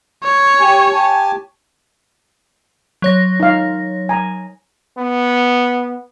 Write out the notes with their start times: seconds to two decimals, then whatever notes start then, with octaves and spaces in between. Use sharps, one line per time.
0.23 C#5
0.61 G4 G#5
0.92 G4 G#5 A5
3.02 F#3 C#5 A#6
3.40 D#4 F5
4.09 G#5 A#5
4.98 B3